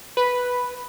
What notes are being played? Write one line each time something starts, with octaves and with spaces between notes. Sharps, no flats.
B4